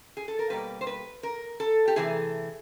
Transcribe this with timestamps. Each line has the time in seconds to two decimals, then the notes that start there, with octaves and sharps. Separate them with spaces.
0.17 G#4
0.28 A4
0.39 A#4
0.50 B2 G3 A#3 B4
0.81 C5
0.87 B4
1.23 A#4
1.60 A4
1.88 G4
1.96 C3 E3 A3 G#4